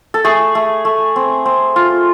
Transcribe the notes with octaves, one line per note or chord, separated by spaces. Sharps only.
A4
A3 G#4
A3
A3
C4
C4
F4